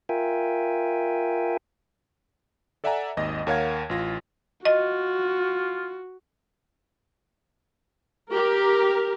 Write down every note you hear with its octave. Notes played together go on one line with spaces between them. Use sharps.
F4 A#4 E5 G5 G#5
A4 D5 E5 F#5 G#5 A#5
G#1 D#2 D#5 A#6
D#2 A#4 C#5 F5 F#5 G#6
A1 F4 A#6
F4 F#4 D#5
G4 A#4